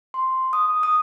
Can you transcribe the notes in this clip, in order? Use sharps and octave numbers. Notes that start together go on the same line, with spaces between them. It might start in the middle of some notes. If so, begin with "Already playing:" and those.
C6
D#6
D#6